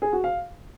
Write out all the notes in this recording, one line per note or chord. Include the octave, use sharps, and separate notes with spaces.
G#4
F#4
F5